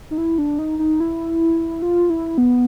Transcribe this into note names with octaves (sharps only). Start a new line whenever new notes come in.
D#4
E4
D4
D#4
D#4
E4
F4
E4
B3